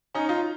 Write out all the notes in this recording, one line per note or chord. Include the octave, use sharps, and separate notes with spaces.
C#4 D#4
D#4 F4